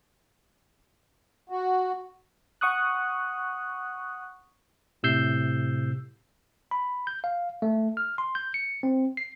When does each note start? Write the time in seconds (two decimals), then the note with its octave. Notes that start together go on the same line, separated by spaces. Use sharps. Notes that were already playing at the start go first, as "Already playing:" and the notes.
1.49 F#4
2.61 F#5 C#6 D#6 F#6
5.03 A2 C3 E6 G6 C7
6.71 B5
7.07 G6
7.24 F5
7.62 A3
7.97 F6
8.18 C6
8.35 G6
8.54 C#7
8.83 C4
9.17 C7